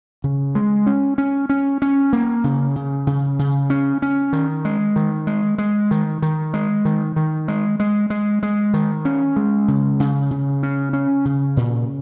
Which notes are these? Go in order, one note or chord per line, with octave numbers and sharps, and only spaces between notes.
C#3
G#3
C#4
C#4
C#4
C#4
A#3
C#3
C#3
C#3
C#3
C#4
C#4
D#3
G#3
D#3
G#3
G#3
D#3
D#3
G#3
D#3
D#3
G#3
G#3
G#3
G#3
D#3
C#4
G#3
C#3
C#3
C#3
C#4
C#4
C#3
A#2